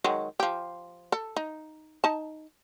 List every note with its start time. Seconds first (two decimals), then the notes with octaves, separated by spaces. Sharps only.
0.04 D#3 F#3 G#3
0.40 F3 G4
1.12 A4
1.36 D#4
2.04 D#4 A5